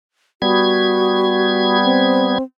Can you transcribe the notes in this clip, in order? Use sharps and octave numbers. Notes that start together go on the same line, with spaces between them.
G3 B3 F#4 G#6
C4